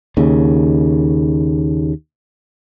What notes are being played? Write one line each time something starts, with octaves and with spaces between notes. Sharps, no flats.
D#2 C#3